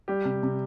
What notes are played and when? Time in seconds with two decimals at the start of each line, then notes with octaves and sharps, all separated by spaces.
0.08 G3 G4
0.25 C3
0.43 C3